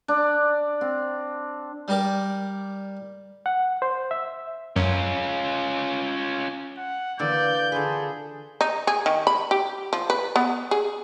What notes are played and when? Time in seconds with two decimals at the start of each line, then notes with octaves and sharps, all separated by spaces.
0.08 D4
0.81 C4
1.88 G3 A#4 D5
3.46 F#5
3.82 C5
4.11 E5
4.76 F#2 C#4 F4
6.78 F#5
7.19 D3 E3 A#3 D5 G6
7.72 D3 F4 G#4 A4 B4
8.61 D#4
8.87 G#4
9.06 D#3
9.27 B5
9.51 G4
9.93 F3
10.10 B4
10.36 B3
10.71 G#4